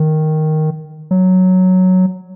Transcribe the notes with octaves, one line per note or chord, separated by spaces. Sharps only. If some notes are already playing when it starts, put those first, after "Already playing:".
Already playing: D#3
F#3